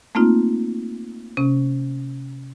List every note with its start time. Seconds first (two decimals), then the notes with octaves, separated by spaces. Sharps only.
0.15 A3 A#3 C4 D#4 F4
1.37 C3 C#4